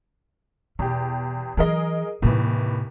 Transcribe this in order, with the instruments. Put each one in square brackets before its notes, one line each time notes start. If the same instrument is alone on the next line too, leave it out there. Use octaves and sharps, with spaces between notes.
[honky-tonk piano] E2 G4 [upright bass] B2
[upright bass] E3 F#3 [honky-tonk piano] G#4 A#4 D#5
[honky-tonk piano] D#2 E3 [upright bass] A2 C3